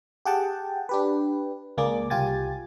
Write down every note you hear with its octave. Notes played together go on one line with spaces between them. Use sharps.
G4 G#4 F#5 G5 A5
D4 G4 B4
C#2 A#3 G#4 D5 D6
C2 F4 G4 G#5 A6